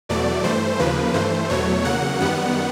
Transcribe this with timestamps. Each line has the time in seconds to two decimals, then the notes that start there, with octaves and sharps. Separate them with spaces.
0.09 E2 B2 F#3 A3 D5
0.44 G2 E3 A3 C5
0.79 D#2 C#3 F3 A#3 B4
1.14 G2 E3 A3 C5
1.50 E2 B2 F#3 A3 C#5
1.84 E2 C#3 F#3 A#3 F#5
2.20 F#2 D#3 G3 B3 F#5